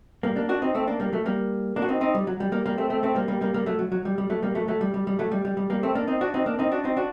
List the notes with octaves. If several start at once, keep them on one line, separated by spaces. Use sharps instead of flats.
G3 A#3
A#3 D4
D4 F#4
C4 D#4
A3 C4
A#3 D4
G3 A#3
F#3 A3
G3 A#3
A#3 D4
F#4
C4 D#4
C4 D#4
G3
F#3
G3
G3 A#3
G3 A#3
A3 C4
A3 C4
A3 C4
G3 A#3
G3 A#3
G3 A#3
G3 A#3
F#3 A3
F#3
F#3
G3
G3
F#3 A3
G3 A#3
F#3 A3
F#3 A3
G3
G3
G3
F#3 A3
G3
G3
G3
G3 A#3
A3 C4
A#3 D4
C4 D#4
D4 F#4
C4 D#4
A#3 D4
C4 D#4
D4 F#4
C4 D#4
D4 F#4